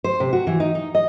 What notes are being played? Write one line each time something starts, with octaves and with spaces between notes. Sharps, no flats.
C5
C3
F#4
E3
D#4
D#4
D#5